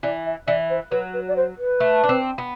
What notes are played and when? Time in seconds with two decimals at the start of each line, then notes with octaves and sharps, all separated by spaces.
0.03 E3 D5
0.26 E5
0.47 E3 D5
0.70 C5
0.91 F#3 B4
1.14 B4
1.28 D5
1.36 C5
1.58 B4
1.80 A3
2.03 D4
2.09 C4
2.38 B3